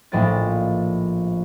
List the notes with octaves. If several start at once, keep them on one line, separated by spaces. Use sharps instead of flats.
A#1 A2 F3 D5 D#5 A6